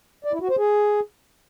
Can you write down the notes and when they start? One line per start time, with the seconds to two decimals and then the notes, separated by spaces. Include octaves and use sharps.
0.24 D5
0.33 E4
0.41 F#4
0.50 C5
0.58 G#4